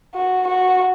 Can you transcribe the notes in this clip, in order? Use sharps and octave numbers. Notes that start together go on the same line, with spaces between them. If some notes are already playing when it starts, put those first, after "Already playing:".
F#4
F#4